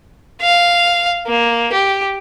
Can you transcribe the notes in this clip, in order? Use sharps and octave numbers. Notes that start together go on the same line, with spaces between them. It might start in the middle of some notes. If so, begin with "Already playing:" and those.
F5
A#3
G4